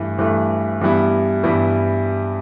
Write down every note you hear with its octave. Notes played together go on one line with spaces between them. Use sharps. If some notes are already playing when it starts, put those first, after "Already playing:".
Already playing: G2 E3 A3
G2 E3 A3
G2 E3 G3 B3 E4
G2 E3 G3 B3 E4